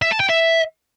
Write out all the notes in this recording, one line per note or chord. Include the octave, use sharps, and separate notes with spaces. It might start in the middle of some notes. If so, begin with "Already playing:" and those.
E5
A5
G5
E5